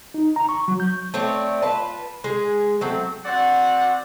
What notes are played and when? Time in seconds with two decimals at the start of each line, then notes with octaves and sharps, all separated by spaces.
0.14 D#4
0.36 A#5
0.49 C#6
0.68 F#3
0.80 G6
1.14 A3 C4 C#5 D5
1.62 F4 B4 A5
2.24 G#3 G#4
2.81 F#3 A3 C4
3.24 C4 F#4 D5 F#5